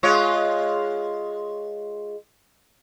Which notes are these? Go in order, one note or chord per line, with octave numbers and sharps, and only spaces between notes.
G#3 F4 C#5